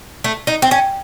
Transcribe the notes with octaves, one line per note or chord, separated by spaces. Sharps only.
A3
D#4
C4
C#4